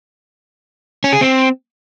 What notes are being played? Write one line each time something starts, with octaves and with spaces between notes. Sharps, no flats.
C#4
G#4
C4